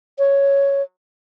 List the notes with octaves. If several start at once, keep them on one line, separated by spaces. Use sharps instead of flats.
C#5